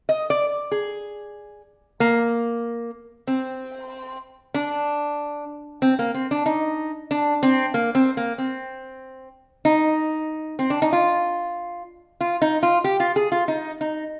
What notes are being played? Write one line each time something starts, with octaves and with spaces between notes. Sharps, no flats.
D#5
D5
G#4
A#3
C4
D4
C4
A#3
C4
D4
D#4
D4
C4
A#3
C4
A#3
C4
D#4
C4
D4
D#4
F4
F4
D#4
F4
G4
F4
G#4
F4
D#4
D#4